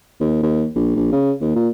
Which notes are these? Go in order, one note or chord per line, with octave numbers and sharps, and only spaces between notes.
D#2
D#2
A#1
A#1
C#3
D#2
A#2